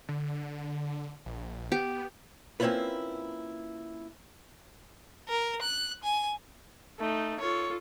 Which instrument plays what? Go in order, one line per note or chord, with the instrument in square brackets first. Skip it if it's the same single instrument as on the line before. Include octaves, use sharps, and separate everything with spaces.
[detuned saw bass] D3
A#1
[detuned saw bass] B3 [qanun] G4
[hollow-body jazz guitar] A#3 C4 C#4 E4 F4 B4
[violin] A#4
F#6
G#5
[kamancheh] A3 [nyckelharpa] D#4
[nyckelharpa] F4 A4 [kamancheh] C#5